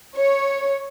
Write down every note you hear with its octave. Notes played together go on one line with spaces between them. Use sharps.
C#5